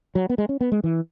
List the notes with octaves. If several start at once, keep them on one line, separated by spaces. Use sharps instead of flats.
F#3
B3
G#3
C#4
B3
G#3
E3